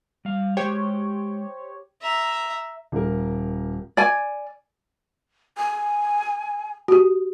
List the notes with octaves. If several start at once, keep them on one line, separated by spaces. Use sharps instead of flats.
G3 F5
G#3 G4 C5 C#5 G5
E5 A#5
D#1 A#4
D5 G#5
G#5
F#4 G4